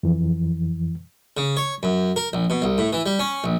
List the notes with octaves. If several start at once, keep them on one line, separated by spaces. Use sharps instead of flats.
F2 E3
C#3
C#5
F#2
A#4
A#1
B2
C2
A2
E3
G3
C#4
A#1